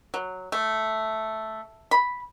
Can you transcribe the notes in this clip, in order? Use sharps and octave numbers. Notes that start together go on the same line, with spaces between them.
F#3
A3
B5